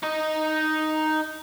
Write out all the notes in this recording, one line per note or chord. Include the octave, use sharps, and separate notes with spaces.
D#4 D#5